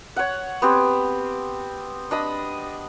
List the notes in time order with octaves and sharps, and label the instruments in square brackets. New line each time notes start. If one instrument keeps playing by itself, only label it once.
[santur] C#5 F#5
B3 C4 G4
D4 D#5 B5